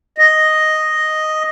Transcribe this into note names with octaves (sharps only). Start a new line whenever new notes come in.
D#5